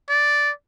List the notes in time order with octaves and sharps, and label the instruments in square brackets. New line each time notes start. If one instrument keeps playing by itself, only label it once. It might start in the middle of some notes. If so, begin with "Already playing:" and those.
[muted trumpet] D5